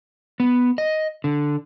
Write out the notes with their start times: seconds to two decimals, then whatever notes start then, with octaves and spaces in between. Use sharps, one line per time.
0.40 B3
0.78 D#5
1.24 D3